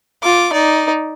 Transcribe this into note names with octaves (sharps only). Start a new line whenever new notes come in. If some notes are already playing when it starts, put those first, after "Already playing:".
F4 D6
D#4 D5